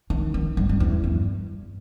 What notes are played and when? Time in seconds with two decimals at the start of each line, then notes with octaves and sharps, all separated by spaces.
0.10 D#3
0.34 D#3
0.57 G2
0.69 G2
0.80 E2
1.04 G2